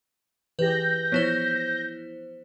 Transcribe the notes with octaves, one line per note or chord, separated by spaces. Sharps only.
E3 G4 G#4 B4 G6 A#6
F3 B3 E4 C5 C#5